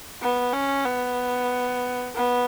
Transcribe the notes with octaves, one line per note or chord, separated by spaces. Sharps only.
B3
C#4
B3
B3